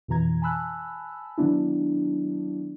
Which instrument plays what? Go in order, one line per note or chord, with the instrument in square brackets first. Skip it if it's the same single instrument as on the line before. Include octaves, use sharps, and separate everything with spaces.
[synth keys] F2 B2 E3 A#5 G#6
G#5 A5 B5 E6 F#6
D#3 F#3 B3 D4 E4